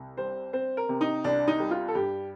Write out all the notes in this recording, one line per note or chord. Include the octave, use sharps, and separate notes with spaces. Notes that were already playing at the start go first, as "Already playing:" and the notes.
Already playing: C2
G3 C5
C4 C5
A#4
C3
D#4
C2 D4
D#4
G3
F4
A4
G2 G4